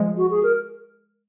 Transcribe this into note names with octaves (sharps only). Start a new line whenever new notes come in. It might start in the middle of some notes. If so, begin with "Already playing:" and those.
Already playing: F3 G#3
F#4
G#4
A#4